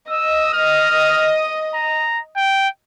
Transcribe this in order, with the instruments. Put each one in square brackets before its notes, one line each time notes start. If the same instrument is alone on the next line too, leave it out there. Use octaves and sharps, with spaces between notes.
[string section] D#5 [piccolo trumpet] E6
[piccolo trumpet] F6
A#5
G5